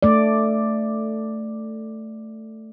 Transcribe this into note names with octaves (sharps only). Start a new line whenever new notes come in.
A3 D5